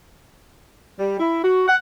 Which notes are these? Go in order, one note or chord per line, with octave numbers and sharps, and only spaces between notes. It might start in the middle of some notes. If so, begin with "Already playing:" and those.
G3
E4
F#4
F#5